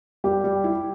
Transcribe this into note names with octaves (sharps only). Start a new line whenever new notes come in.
G3 G4
G3
E4